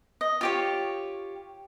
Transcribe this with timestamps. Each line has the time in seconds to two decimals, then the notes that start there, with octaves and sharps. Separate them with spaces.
0.21 D#5
0.41 F4 G4 C#5